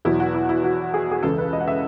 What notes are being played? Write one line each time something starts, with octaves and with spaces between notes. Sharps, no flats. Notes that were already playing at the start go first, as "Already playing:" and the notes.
E2 B2 F#3 B3 E4
F#4
E4
E4
F#4
G#4
G#4
C#2 C#3 E3 A4
B4
D#5
F#5
E5